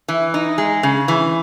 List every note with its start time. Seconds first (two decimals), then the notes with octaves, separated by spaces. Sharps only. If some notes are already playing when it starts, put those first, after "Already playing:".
0.08 E3
0.34 D#4
0.58 G#3
0.83 C#3
1.08 E3